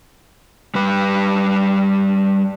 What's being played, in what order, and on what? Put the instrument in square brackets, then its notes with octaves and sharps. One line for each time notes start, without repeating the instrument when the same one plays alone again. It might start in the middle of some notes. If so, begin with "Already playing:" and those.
[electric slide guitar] G3 B4